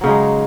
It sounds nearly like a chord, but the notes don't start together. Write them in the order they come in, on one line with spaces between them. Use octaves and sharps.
F#3 C#3 D#4 G#3